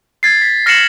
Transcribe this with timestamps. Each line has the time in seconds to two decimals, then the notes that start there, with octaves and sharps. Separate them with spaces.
0.23 G#6 A6 C7
0.42 B6
0.66 F6 A#6 C7 C#7 E7 F#7